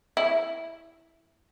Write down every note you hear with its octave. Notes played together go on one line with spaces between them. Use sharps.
E4